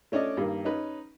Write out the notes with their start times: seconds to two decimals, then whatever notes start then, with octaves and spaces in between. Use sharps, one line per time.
0.12 A3 C#4 D4 D5 D#5
0.37 G2 D#3 A#3
0.65 C#4 D#4 B4